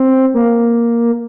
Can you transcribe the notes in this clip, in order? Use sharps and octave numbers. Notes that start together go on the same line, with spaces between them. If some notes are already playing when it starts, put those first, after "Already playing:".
Already playing: C4
A#3